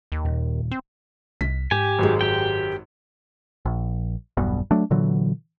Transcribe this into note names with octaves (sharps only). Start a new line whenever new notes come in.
D#2
D#1
C4
C2 B6
G#2 G4 G#5
G#1 F#2 G#3
G4 G5
A#1
E1 B1 G2 B2
F#3 A3 D4
A#2 D3 E3 F#3